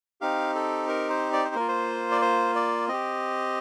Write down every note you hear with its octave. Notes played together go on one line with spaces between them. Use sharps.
C4 D#4 G4 F5
A4
A#4
C5
D5
C5
A#3 F4 A#4
C5
D5
C5
D5
C4 G4 D#5